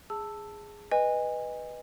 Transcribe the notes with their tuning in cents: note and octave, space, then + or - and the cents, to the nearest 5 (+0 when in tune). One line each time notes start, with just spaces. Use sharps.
G#4 -5 A5 +5 E6 +0
B4 +0 D#5 -10 G#5 -25